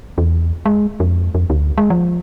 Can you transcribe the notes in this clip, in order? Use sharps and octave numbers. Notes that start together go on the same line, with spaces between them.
E2
G#3
F2
F2
D2
G#3
F3